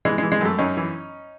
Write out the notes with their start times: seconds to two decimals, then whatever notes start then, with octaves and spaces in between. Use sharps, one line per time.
0.05 E3 G#3
0.18 E3 G#3
0.32 G#3
0.41 F#2 A3
0.59 F#2 C#4 D#4
0.77 E3